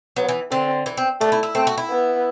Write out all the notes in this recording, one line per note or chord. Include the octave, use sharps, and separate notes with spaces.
F#3 B3
E3
D3 C4
E3
C4
A3 D4
E4
E4
A3 C4
F#4
E4
B3